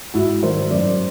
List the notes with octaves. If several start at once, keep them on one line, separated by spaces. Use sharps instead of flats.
G#2 E4 F#4
D#3 G3 A#4 C5
F#2 C5 D5